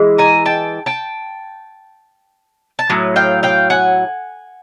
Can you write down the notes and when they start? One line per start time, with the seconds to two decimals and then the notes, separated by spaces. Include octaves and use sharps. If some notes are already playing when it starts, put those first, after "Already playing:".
Already playing: E3 G#3
0.18 G#5 A#5
0.45 G5 A5
0.86 G5 A5
2.79 A5
2.90 A2 F#3
3.16 F5 G5
3.43 F5 G5
3.70 F#5 G#5